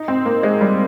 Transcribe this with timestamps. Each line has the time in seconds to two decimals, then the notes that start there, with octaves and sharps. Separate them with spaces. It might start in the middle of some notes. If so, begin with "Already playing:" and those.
Already playing: D#4
0.08 C4
0.25 A#3
0.43 G#3
0.61 G3